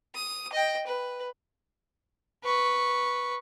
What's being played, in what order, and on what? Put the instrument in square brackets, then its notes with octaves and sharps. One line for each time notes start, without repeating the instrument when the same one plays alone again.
[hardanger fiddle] D#6
D#5 G5
B4
[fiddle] B4 C#6